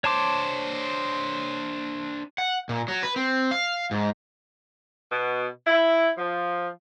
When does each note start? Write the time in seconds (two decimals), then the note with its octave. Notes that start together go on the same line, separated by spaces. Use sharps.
0.04 D4 C5 C#5 A5 D6
2.38 F#5
2.69 A#2
2.88 F#3
3.03 B4
3.16 C4
3.51 F5
3.91 G#2
5.11 B2
5.67 E4
6.16 F3